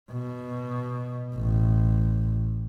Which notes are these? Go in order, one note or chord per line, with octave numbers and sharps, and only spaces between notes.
B2
A1